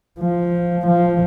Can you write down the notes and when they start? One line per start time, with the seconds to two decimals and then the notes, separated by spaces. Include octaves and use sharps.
0.20 F3
0.87 F3